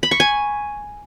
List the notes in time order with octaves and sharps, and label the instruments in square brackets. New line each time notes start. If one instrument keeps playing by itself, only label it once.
[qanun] B5
C#6
G#5